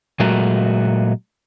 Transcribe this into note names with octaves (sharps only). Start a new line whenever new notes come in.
A#2 F#3 G#3 A3 F#4 A#4